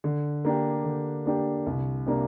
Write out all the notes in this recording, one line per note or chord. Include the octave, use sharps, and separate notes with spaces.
D3
A#3 D4 G4
D3
A#3 D4 G4
C2
C3 A#3 D4